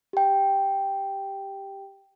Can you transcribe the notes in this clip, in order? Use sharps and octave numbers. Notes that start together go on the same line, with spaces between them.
G4 G5